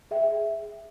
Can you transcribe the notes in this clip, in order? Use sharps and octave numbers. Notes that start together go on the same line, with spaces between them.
G#4 E5 G5